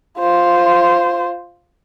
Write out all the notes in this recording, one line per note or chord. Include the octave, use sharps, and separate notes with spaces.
F4 C5